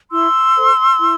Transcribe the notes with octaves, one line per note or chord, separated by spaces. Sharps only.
E4 C6 E6
A4 C5
E4